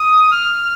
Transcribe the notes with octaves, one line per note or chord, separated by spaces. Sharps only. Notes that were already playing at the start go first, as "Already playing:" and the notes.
Already playing: D#6
F6